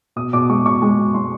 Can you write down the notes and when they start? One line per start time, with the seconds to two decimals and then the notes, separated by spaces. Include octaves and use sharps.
0.16 B2 D#6
0.33 B2 D6
0.49 G#3 C#6
0.65 B2 C#6
0.82 G#3
0.98 B2
1.14 G#3 C6